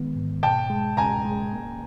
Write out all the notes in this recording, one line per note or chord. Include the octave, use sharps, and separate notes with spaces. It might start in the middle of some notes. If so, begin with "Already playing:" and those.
Already playing: D#3 G#3 B3
G#2
B2 G5 A5
G#3
C#2 G#5 A#5
G#3
A#3